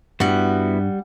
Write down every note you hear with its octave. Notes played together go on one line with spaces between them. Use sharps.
G2 G3 B3 E4 F#4 F#5